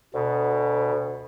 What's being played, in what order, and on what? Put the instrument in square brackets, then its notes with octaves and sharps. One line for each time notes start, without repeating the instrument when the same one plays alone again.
[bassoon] D2 [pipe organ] B2